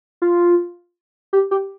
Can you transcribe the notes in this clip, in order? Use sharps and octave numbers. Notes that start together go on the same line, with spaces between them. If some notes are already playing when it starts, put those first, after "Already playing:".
F4
G4
G4